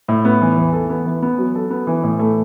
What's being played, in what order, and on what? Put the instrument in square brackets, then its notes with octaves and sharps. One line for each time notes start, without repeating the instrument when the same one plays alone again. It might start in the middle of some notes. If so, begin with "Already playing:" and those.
[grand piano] A2
B3
E3
E2
A4
B3
E3
B3
F#3
A4
B3
E3
A2
A3